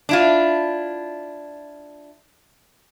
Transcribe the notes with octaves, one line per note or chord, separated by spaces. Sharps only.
D4 E4 F4